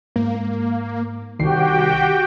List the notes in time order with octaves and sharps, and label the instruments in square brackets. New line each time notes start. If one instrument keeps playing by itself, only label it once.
[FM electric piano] G#2 [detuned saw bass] A#3
[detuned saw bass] C2 [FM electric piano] D#3 C7 [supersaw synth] F#4 G4 G5